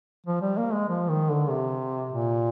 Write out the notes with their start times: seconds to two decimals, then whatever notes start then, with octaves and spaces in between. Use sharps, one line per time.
0.26 F3
0.41 G3
0.58 A#3
0.73 G#3
0.89 F3
1.09 D#3
1.30 D3
1.50 C3
2.13 A#2